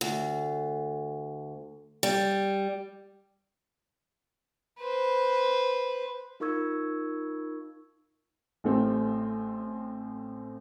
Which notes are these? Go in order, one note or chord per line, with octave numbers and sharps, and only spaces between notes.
D2
G3
B4 C5
D#4 F4 A#4 C#6 E6 G#6
A1 A3 C4